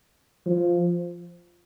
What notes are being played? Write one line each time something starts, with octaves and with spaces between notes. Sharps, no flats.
F3